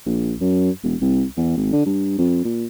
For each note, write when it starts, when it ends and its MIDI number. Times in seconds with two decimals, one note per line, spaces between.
0.06 0.34 34
0.41 0.70 42
0.83 0.95 28
1.01 1.24 36
1.37 1.56 40
1.57 1.68 32
1.72 1.84 50
1.86 2.17 43
2.18 2.44 41
2.44 2.66 46